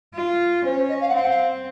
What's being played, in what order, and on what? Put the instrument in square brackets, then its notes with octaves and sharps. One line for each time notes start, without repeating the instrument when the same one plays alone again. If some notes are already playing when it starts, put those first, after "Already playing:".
[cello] F4
[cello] C#4 [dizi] C5
[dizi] C5
D#5
F5
F#5
[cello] C4 [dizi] F5
[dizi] F#5
F5